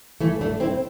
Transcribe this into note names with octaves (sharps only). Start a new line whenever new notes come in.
E3 A3
A3 D4
C4 E4